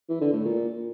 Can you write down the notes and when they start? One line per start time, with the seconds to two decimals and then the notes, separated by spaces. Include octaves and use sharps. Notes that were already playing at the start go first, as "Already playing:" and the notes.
0.09 E3
0.21 D3
0.33 A2
0.45 A#2